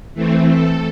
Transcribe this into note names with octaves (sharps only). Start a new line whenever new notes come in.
E3 A3 C4
A4